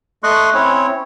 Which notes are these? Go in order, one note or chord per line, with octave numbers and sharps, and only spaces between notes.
A3 D#5 C6 C#6 F#6
C4 C#4 E4 C#5